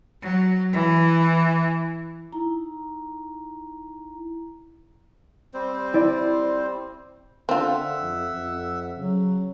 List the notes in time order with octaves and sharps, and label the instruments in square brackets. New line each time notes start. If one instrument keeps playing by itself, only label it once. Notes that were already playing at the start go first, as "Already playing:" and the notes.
[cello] F#3
E3
[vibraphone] D#4 E4 A#5
[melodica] G3 C4 C5
[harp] E4 D5
[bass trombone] D3 [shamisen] C4 F4 [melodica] E5 F#5 E6
[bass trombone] F2
F2
[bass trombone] C#3 [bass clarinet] F#3